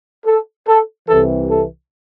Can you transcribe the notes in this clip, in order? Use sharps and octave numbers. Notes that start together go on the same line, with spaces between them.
A4
A4
C2 C3 E3 A4
A4